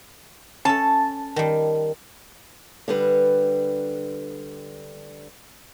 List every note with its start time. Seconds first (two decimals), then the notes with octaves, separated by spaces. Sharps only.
0.65 C#4 A4 A5
1.36 D#3 G3
2.88 D3 G3 B4